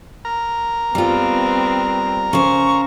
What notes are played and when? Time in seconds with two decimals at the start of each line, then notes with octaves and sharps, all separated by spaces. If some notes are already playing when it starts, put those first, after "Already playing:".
0.25 A#4 A#5
0.95 G3 B3 C4 F4
2.33 C#3 C5 C#6